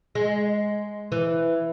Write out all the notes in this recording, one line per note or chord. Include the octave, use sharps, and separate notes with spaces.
G#3
E3